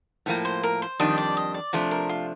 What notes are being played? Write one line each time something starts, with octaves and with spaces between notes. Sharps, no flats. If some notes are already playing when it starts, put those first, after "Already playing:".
A2 F3 A#3
C5
A#4
C5
F2 D#3 G3 D4 D#5
D5
D#5
D5
C3 F3 A3 D4
A#4
F4